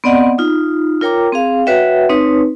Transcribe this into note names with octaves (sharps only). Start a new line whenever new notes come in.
B3 C4 D5 D#5 F#5
D#4 F4
F4 A#4 C#5 G5 A#5 D6
C4 G#4 F5
F#4 B4 C#5 E5 F#5 G5
C4 D#4 B4 C#5